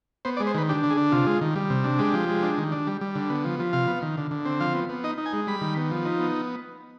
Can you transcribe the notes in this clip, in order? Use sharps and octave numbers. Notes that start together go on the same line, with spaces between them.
B3 C5
D5
G#3
C5
D#3 B4
D4 G4
D3
G#4
D4
C3 F4
G#3
D#3
G3
C3
D4
G#3 G4
F3
G#3
D4
D#3
D4
G3
G3
D3
B3
F3
F3
C3 F5
B3
D#3
D3
D3
C4
F3 F5
B3
B3
D#4 D#5
D#4
G#5
G#3
G3 B5
D#3
B3
F3
D#4
B3